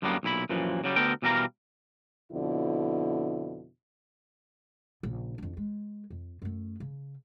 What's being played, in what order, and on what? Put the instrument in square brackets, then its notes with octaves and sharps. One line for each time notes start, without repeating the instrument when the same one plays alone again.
[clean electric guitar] F#2 A2 D3 G3 A#3 B3
B1 A#2 E4 B5
F#2 A#2 E3 F3
C#3 F#3 G3
D2 D3 B3 A4 A#4 G5
B2 E3 G3 A#4 F5 A#5
[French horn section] F2 B2 D3 E4
[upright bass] A#1 C#3
F2 D4
G#3
F2
F#2 A3
C#3